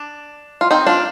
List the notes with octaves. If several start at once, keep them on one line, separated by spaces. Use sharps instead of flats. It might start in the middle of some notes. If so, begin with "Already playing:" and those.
Already playing: D4
F4
C4 D#4
D4 F4